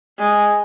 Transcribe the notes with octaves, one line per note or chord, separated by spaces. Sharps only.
G#3